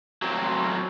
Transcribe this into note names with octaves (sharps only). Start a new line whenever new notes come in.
F#3 C4